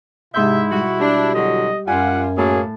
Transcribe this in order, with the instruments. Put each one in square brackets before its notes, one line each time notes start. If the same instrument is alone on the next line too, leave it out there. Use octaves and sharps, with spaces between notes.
[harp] G#2 C6 G6 [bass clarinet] C3 [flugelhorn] E4 [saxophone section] E5
[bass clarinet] B2 [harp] G3 [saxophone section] F#4
[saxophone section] D4 [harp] G4
[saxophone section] E2 D3 F#3 [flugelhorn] D#5
[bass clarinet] F#2 [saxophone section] G3 F4 [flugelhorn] F#5 [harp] G#5
[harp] A2 A5 [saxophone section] F#3 A#3 [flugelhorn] G#4